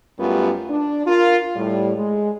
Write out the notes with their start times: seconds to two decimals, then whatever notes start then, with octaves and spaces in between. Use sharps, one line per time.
0.19 F#2 G3 A3 B3 F4 G4
0.69 D4
1.06 F4 A#4
1.56 A2 G3
1.96 G#3